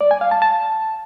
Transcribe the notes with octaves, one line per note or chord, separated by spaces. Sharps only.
D5
G#5
F5
A5
A5